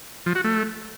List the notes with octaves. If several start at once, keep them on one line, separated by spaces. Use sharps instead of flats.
F3
F#4
A3